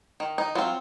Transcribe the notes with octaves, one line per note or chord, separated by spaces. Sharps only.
D#3
D#4
F#3 C4 F4